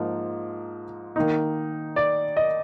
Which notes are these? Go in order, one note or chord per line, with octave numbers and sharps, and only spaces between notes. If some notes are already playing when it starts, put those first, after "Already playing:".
Already playing: G#2 F3 A#3
D#3 A#3 D#4
D5
D#5